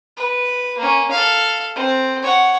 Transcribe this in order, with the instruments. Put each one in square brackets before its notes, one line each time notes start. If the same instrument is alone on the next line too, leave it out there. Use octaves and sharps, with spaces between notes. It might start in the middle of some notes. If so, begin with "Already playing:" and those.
[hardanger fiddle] B4
A#3 C#4
A4 F5
C4
C#5 F#5